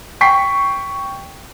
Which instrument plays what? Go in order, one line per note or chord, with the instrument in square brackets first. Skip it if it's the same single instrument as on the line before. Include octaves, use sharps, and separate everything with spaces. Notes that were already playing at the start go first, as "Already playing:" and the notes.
[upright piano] G5 C#6 B6 C7